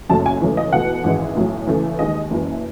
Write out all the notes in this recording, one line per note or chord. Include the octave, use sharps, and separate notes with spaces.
F#1 F#2 C#3 F#3 A3 A5
G#5
E2 C#3 F#3 A3
D#5
E2 B2 A3 F#5
G#1 F#2 E3 G#3
B1 A2 F#3
E2 C#3 E3 A3
D#2 D#3 G#3 D#5
F#1 F#2 E3